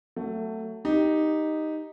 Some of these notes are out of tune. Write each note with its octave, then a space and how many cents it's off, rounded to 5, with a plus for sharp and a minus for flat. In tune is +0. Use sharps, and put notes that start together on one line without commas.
F#3 +15 A3 +20
D#4 +0 G4 +0